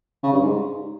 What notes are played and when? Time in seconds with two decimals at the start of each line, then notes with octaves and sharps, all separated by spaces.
0.23 C#3
0.33 G2
0.43 G#2